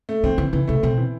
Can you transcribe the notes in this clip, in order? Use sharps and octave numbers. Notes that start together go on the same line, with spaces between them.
A3
D#3 C4
D3 E3
C#3 E3
C3 A3
B2 C4
E3